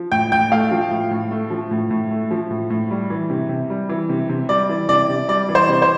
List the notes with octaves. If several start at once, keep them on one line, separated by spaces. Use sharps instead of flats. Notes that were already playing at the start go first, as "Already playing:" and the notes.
Already playing: F3
A2 G5
A2 G5
A3 F5
F3
A2
A2
A3
F3
A2
A2
A3
F3
A2
A2
G3
E3
C3
C3
G3
E3
C3
C3
G3 D5
E3
C3 D5
C3
G3 D5
E3
C5
C3
C5